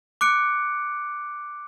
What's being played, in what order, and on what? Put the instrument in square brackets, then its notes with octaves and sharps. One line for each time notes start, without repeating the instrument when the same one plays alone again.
[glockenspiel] D6 F#6 C#7 D7